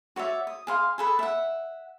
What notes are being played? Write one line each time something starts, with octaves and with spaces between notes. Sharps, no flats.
F#4 C#5 D5 E5
D#6
G#4 F5 C6
G#4 A4 B4
E5 F#5